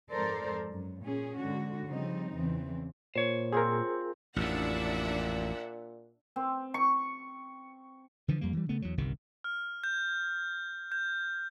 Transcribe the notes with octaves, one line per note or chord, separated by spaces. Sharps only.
F2 G#2 A4 A#4 C5 D5
F#2
A#2 C#4 G#4
G#2 D3 F#4
C#3 F3 G3 C4 D#4
E2 C#3 E3 C4
A#2 C5 C#5
C4 F4 G#4 A#4
A1 F2 A#2 D4 E5 F#5
C4
C#6
D3 E3 F3
F2 G3 A#3
E3 G3
C#3 A3 B3
E2 F#3
G1 C2 C3 D#3
F6
G6
G6